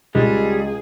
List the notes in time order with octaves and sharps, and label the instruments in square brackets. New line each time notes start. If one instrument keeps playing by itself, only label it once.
[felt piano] C#2 [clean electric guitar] G3 [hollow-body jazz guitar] G#3 [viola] G#4